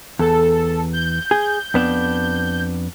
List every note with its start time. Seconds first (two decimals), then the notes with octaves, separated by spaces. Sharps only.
0.19 E2 A4
0.93 G6
1.31 G#4
1.74 F2 B3 D4